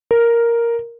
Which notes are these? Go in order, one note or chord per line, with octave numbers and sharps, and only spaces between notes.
A#4